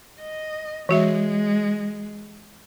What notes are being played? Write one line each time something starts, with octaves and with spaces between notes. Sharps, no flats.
D#5
E3 G#3 F#4 E5